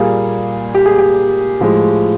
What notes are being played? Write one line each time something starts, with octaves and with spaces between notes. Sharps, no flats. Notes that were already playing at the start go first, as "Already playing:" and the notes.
Already playing: A#2 G3 A#3 G#4
G4
G#4
G4
A2 F3 G#3